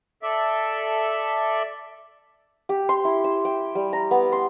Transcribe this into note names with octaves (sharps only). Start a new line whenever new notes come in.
A4 D5 E5
G4
C6
E4
E6
G5
G3
A#5
B3
C6